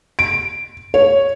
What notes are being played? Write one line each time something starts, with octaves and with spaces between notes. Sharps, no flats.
D7
C#5